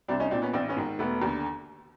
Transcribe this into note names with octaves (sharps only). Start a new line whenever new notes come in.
C2 C4 D4
C#4 D#4
A#2 C4 D4
B3 C#4
A1 C4 D4
B3 C#4
G#2 D#3
E1 A3 B3
D#2 D3